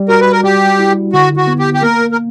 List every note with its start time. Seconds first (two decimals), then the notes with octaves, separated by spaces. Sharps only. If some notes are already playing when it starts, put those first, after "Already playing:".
Already playing: G3
0.09 F#4 A#4
0.20 B4
0.32 A#4
0.44 G3 G4
0.79 E4
1.13 D3 F#4
1.37 F#4
1.47 B3
1.59 G4
1.74 G4
1.82 A#3 A#4
2.12 A#4